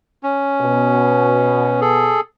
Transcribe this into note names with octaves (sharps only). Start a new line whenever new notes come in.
C#4
B2
G#4 A4